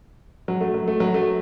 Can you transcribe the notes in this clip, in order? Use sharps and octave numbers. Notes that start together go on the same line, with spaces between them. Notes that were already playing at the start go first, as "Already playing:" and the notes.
F#3
A3
F#3
A3
F#3
A3